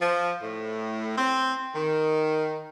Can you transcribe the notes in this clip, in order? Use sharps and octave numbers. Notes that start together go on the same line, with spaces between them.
F3
A2
C4
D#3